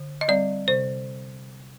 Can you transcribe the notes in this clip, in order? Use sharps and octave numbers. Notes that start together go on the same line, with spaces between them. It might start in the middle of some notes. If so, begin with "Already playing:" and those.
Already playing: D3
D#5
G3 C4 D5
C3 C5